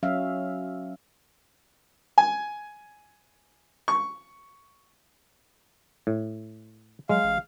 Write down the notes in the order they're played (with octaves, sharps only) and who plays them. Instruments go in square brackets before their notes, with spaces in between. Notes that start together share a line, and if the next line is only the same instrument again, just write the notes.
[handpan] F#3 C#4 E5 F5
[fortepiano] G#5
C#6
[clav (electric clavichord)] A2
[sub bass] F#3 [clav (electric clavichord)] G#3 [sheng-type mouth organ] F5
[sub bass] A1